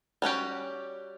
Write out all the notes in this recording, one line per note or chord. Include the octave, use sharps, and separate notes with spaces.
G3 C#4 F#4 G4